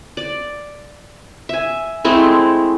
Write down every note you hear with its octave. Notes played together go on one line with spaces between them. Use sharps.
D5
E5 G#5
G#3 A3 C4 E4